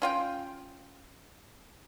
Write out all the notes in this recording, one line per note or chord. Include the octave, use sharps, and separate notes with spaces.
C#4 F4 G5